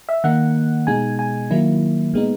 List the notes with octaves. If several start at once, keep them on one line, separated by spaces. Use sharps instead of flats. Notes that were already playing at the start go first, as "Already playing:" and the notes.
E5
D#3 A#3 D#4 F#5
B2 G#3 D#4 G#5
G#5
D#3 F#3 A#3 E4
A#2 G#3 B3 D#4